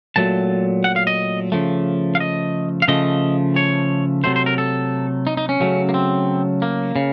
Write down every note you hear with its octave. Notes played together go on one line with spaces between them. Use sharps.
A#2 F#3 A3 A5
F#5
F5
D#5
C#3 F3 A3
F5
D#5
F5
C#3 F3 A3 D#5
C#5
C3 F#3 A3 C5
C5
A#4
A4
D#4
D#4
C#4
C#3 F#3 A3
A#3
C4
A#3
C#3